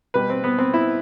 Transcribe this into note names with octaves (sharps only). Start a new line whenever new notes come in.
B2 G3 B4
C4
B3
C4
E4